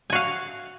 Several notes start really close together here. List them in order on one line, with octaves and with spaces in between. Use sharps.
G#5 F#4 F5